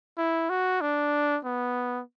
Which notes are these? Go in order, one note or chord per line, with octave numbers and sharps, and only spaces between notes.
E4
F#4
D4
B3